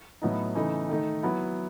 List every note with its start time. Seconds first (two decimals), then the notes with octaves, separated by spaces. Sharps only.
0.22 A2 F#3 B3 D#4
0.55 C#3 E3 A3 D#4
0.89 D#3 A3 D#4
1.23 F#3 B3 E4